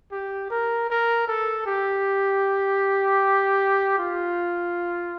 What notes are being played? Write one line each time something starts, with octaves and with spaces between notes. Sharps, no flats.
G4
A#4
A#4
A4
G4
F4